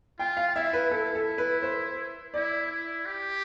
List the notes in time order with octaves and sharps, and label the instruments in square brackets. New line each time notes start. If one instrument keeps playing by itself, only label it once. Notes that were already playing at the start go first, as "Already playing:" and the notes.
[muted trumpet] F4 [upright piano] G5
[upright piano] F5
[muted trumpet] E4 [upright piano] E5
[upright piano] B4
[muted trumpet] E4 [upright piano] A4
[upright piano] A4
B4
C5
[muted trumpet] E4 [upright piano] D5
[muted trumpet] E4
G4